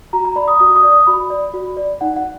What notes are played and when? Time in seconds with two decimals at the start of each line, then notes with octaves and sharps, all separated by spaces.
0.13 F#4 A#5
0.25 A#5
0.36 D5 B5
0.48 D#6
0.59 F#4 D#6
0.76 D#6
0.83 D5
0.92 D#6
1.07 F#4 B5
1.30 D5
1.54 F#4
1.77 D5
2.01 D#4 F#5
2.16 F#5